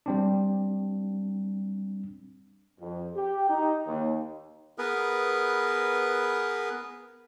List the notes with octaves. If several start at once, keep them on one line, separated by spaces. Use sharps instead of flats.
G3 C4 D4
F2
G4
D#4
D#2
B3 G#4 A#4 B4